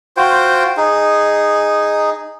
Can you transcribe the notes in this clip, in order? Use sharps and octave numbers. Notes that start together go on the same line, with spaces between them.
F4 F#4 C5 G5
D#4 G#4